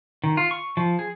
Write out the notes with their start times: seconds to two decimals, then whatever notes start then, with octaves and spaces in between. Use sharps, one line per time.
0.24 D#3
0.37 F4
0.51 C#6
0.77 F3
0.99 G#4